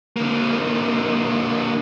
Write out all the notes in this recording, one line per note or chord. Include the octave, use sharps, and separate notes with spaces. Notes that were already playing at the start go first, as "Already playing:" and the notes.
D3 A#3